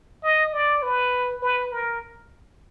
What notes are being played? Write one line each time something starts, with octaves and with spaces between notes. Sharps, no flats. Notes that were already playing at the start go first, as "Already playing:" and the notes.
D#5
D5
B4
B4
A#4